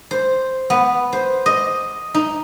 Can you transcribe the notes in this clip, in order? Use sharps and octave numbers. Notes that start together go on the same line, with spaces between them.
C5
B3
C5
D#5
D#4